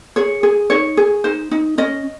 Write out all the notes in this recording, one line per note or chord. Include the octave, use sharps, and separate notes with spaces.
G#4 C#5
G#4
D#4 C#5
G#4
D#4 C5
D#4
C#4 D#5